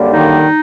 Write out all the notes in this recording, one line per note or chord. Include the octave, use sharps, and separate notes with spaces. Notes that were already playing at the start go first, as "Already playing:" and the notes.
Already playing: F#2 D3 G3 A#3
D#3 D#4